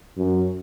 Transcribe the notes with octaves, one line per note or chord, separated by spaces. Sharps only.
F#2